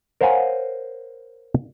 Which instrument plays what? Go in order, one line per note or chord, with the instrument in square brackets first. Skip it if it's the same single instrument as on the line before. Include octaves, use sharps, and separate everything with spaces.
[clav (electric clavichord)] A#4 C5 C#5 F5 F#5 G#5